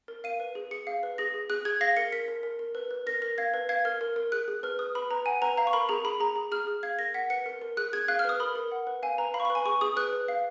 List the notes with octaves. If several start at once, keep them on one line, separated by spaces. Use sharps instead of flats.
A#4
F5 D#7
B4
G#4
G#4 C#7
F5
B4
G#4 A#6
G#4
G#4 F#6
G#4 G#6
F5 A#6
A#4 C#7
A#4 B6
A#4
A#4
A#4
B4
B4
A#4 A#6
A#4 A#6
F5 G#6
B4
F5 G#6
A#4 F6
A#4
A#4
G#4 F#6
G#4
B4 F6
B4 D#6
B4 B5
B4 A#5
F#5 G#5
B4 A#5
F5 A#5
C#6
A#4 B5
G#4 A#5
G#4 B5
G#4 A#5
G#4
G#4 F6
G#4
F5 G#6
A#4 A#6
F#5 B6
B4 C#7
A#4
A#4
G#4 F#6
G#4 G#6
F5 F#6
F6
B4 D#6
A#4 B5
A#4
F#5
B4
F5 G#5
B4 A#5
F5 B5
C#6
B4 B5
G#5
G#4 C#6
G#4 D#6
B4 F#6
B4
F5